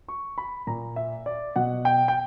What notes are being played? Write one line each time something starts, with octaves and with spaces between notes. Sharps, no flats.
C#6
B5
A#2 A#5
E5
D5
B2 F#5
G5
G5